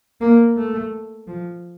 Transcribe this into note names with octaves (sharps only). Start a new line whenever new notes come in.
A#3
A3
F3